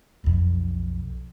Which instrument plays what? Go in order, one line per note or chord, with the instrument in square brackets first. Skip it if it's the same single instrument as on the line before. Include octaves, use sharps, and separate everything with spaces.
[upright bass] B1 F2